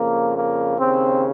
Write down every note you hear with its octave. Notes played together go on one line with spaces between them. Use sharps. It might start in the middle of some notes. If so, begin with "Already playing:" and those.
Already playing: F2 C#3 A#3
A#3
D#2 C#3 C4